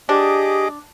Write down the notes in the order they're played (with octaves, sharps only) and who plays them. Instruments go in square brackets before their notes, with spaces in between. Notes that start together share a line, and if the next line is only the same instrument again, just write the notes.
[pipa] D4 [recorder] G4 [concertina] G#4 D#5 D6